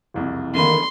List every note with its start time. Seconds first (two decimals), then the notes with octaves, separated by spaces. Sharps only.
0.14 F#1 C2 F2
0.55 E2 D3 D#3 A#3 B5 C6